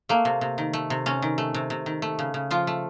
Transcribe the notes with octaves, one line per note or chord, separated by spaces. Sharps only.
A3 A#3
C3
C3
D#3
A3
C3
C3 C#4
D#3
A3
C3
C3
D#3
A3
C#3
C#3
F3 F4
A3